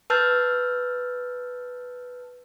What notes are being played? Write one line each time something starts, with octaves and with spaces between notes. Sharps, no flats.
B4 A5 E6 F6 G6 A6